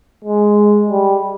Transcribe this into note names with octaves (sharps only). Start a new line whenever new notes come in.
G#3
G3